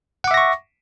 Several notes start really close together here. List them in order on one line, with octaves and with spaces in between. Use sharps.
F#5 D6 E5 A#6 C#6